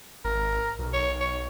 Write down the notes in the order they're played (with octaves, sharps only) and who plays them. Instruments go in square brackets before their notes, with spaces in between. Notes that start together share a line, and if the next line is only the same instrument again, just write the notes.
[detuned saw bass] G#1 [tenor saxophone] A#4
[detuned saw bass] B1
[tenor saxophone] C#5
C#5